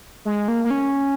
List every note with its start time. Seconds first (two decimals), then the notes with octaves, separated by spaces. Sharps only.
0.25 G#3
0.48 A#3
0.65 A#3
0.70 C#4